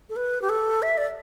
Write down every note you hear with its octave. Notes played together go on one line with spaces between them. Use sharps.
A4
B4
G4
A4
E5
D5